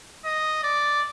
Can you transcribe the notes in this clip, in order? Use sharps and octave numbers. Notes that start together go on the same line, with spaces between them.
D#5
D5